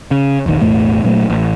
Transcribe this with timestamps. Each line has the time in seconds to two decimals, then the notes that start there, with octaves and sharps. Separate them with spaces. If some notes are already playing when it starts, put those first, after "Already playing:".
0.11 C#3
0.46 E1 A#1 D#3
0.61 B1 E2 A2 A3
1.04 A#2 F#3 G#3 A3
1.30 A1